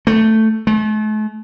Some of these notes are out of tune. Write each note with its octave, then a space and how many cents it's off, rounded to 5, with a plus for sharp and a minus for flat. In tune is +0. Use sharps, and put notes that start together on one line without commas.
A3 +5
A3 -40